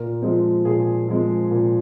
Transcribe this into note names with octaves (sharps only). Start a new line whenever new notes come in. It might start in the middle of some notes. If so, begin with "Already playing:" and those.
Already playing: A#2 A#4
F3 G#3 C4
A#2 G#4
F3 G#3 C4
A#2